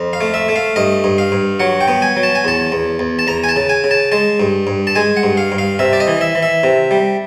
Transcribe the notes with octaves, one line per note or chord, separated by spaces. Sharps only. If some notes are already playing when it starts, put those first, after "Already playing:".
Already playing: F2
F5
A3
E5
A3
F5
G2 D#5
G2
F5
G2
F#3 F#5
G5
B3
G#5
F#3
A5
G#5
E2 A5
E2
E2
A5
E2 A#5
G#5
A5
C#3
G#5
C#3
A5
G#3 A5
G2
G2
A5
G#3 G#5
F#5
G2
F5
G2
F5
C3 E5
D5
D#5
E3
E5
E3
E5
C3
G3